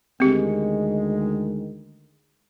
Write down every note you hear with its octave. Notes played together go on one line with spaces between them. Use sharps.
D2 D#3 G#3 C4 G4